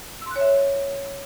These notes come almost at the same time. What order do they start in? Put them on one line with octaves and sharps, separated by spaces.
E6 C6 F#6 C#5 E5